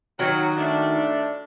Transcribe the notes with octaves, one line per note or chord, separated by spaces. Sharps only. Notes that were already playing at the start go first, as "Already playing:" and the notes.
D#3 F#3 D#4 F#4
A2 A3 D4